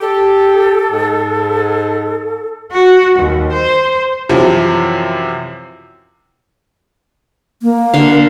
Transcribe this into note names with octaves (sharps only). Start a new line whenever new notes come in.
G4 A4
G#2
F#4
D#2
C5
F#2 C3 E3 F3
A#3
D3 F5